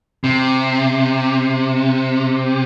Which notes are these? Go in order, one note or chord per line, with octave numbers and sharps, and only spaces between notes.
C3